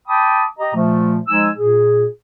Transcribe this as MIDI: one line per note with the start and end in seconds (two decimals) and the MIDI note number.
0.07 0.43 79
0.07 0.43 81
0.07 0.43 83
0.07 0.43 86
0.07 0.43 87
0.59 0.71 67
0.59 0.71 75
0.59 0.71 82
0.75 1.19 46
0.75 1.19 53
0.75 1.19 57
1.28 1.49 53
1.28 1.49 56
1.28 1.49 63
1.28 1.49 80
1.28 1.49 88
1.58 2.06 46
1.58 2.06 68